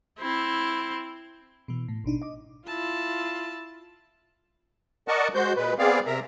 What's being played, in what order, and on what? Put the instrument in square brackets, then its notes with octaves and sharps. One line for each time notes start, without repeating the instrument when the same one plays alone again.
[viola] C4 E4
[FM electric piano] B2 E3
A2
A1 B2 D4 D#4
D#5 D6
[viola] E4 A5 [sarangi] F4
[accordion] A#4 D5 D#5 F#5 A5 C#6
G#3 F#4 C5 G6
A#2 G#3 B4
B3 C4 G#4 D5 F5
C3 A#4 E5 A#5